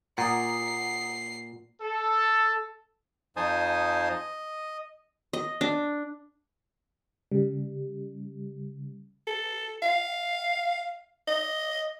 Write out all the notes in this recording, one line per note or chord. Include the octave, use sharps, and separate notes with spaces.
A#2 F#5 A#5 D#6 C7
A4
F2 D#4 C5 G#5 A5 D#6
D#5
D#5
D4
C#3 G3
A4
F5
D#5